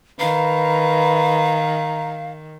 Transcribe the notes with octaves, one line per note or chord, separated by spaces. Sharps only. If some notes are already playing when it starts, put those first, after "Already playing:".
D#3 B4 F5 A#5